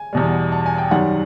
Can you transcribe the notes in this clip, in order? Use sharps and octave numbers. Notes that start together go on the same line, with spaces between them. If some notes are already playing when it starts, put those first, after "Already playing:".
Already playing: G#5
E2 B2 G3
A5
G#5
G5
F#2 D#3 G3 F#5